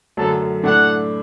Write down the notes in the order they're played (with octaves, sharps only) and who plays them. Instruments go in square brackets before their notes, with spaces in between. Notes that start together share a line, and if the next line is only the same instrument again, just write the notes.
[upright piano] F#2 D3 F#3 A3 [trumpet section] A4
[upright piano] A2 A3 D4 [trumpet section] F#5